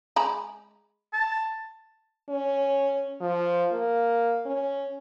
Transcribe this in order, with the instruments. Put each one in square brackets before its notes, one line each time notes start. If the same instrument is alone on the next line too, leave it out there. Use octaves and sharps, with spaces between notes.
[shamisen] G#3 A#5 B5
[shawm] A5
[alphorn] C#4
F3
A#3
C#4